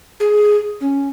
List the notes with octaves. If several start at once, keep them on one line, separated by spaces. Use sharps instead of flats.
G#4
C#4